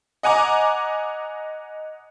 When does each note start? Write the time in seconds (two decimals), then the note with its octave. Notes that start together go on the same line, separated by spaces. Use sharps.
0.23 D#5 F#5 G#5 A#5 D6